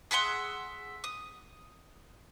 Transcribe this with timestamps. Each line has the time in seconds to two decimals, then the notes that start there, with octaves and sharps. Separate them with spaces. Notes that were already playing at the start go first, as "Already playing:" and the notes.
0.11 G#4 E5 F#5 C6
1.04 D#6